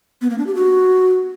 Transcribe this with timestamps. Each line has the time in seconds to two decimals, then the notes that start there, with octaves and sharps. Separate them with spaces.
0.22 B3
0.30 A#3
0.38 D4
0.47 G4
0.55 F#4